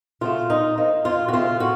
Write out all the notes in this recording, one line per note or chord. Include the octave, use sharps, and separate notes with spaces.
C#3 F#3 A3 F4
A#2 D#4
F3 A#3 D#4
F2 F4
F#4
C#3 A3 C4 F4
A2 F#4